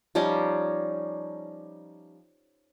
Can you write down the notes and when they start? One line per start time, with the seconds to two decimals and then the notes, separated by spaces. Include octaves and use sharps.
0.15 F3 G3 C#4 D#4